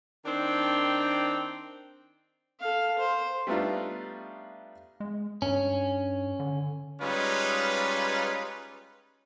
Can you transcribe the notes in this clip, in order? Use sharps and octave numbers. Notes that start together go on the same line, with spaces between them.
D#3 C4 D4
A4 F5
C5
G3 A3 B3 D4 D#4 F4
G#3
G2 C#4
D3
G3 G#3 C#4 D#4 F4 B4